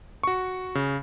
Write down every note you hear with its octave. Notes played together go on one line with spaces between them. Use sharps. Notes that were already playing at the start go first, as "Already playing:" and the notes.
F#4 C#6
C#3